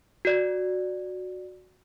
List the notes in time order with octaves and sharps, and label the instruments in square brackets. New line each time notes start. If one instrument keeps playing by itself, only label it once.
[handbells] F#4 D5 G#6